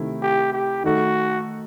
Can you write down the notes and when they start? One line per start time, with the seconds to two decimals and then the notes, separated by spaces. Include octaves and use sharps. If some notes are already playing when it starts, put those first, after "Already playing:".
Already playing: C3 D#3 A3 E4
0.22 G4
0.53 G4
0.84 D#3 A3 D#4 F#4 A4